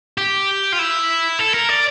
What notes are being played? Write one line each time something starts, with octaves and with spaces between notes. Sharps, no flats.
G4
F4
E4
A4
A#4
D5